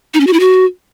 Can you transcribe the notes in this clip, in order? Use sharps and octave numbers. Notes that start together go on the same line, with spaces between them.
D#4
C#4
F#4
E4
F#4